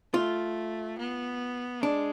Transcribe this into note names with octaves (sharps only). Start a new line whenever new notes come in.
A3 F4
B3
G#3 D4